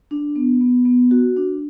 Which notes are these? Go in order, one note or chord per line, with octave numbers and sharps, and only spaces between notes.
D4
B3
B3
B3
F#4
D4